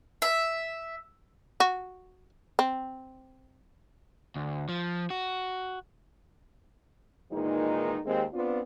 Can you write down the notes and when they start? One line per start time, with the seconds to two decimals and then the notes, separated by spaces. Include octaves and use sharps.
0.22 E5
1.60 F#4
2.59 C4
4.36 D2
4.69 F3
5.10 F#4
7.31 A#2 D#3 E3 G#3 D#4
8.05 D#2 G#3 C4
8.33 B3 C4 D4 F4